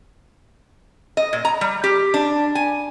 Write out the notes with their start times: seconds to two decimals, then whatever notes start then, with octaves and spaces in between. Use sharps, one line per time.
1.17 D#5
1.33 A#2
1.45 A#5
1.61 G3
1.84 G4
2.14 D4
2.55 G#5